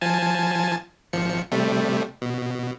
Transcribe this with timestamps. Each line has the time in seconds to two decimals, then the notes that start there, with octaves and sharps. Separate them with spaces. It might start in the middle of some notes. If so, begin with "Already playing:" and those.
0.01 F3 G#5 A5
1.13 G#1 F3 C#7
1.51 C3 G3 A3
2.22 B2